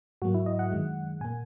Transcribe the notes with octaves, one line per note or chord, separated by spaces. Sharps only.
G#2 F#3 A#3 F#4
E4
D#5
F#5
F#2 D#3 G#3
A#2 A#3 G#5